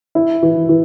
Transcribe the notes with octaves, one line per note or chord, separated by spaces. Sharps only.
E4
E3
E3